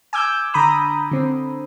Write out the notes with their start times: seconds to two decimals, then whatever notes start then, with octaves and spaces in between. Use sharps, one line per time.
0.13 G#5 D6 E6 G6
0.54 D3 A#5 B5 D#6
1.11 D3 C4